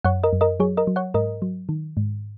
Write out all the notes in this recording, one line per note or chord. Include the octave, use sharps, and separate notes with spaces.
F#2 C#5 F#5
A#4 D#5
F#2
A#4 D#5
F#3 G#4 C#5
A#4 D#5
F#3
C#5 F#5
G#2 A#4 D#5
F#3
D#3
G#2